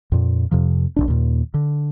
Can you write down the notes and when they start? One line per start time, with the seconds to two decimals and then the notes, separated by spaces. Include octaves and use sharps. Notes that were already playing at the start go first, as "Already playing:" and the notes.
0.12 F2 A#2
0.51 F2 C3 F3
0.96 B1 A2 D4
1.08 D#2 A#2
1.54 D3